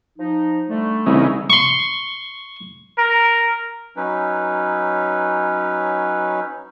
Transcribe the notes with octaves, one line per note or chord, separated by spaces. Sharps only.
F3 D#4
D3 G3 A3
C2 C#3 E3 D#4
C6 C#6
A#4
F#3 C#4 D#4 B4